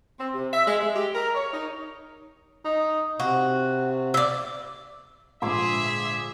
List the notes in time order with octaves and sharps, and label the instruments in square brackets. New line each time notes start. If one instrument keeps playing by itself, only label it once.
[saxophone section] C4
C3
E5
G#3
G#3
G4
A#4
C#5
D#4
[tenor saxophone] D#4
[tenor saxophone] C3 [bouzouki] F#4
[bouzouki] D5 E5
[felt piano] A#1 G#2 D3 [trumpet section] G#4 E5 [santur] C6 D6